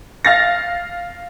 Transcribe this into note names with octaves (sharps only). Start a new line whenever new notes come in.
F5 A6 A#6